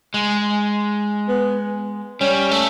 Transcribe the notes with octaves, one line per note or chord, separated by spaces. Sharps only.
G#3
B3
G3 C#4
A3